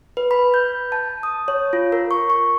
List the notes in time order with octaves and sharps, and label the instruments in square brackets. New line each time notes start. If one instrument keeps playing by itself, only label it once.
[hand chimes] B4
B5
G6
A5
D#6
C#5
F4
A#4
C#6
C#6